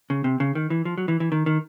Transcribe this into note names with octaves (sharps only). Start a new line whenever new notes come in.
C#3
C3
C#3
D#3
E3
F3
F#3
E3
E3
D#3
D#3